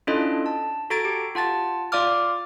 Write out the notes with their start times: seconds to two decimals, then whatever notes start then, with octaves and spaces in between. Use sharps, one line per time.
0.07 C#4 D4 E4 F4 A4 D#5
0.46 A5
0.90 F#4 A4 A#5 G#6 A6 D7
1.05 G4
1.35 F4 F#5 A5 A6
1.92 F4 D5 F5 D6 F6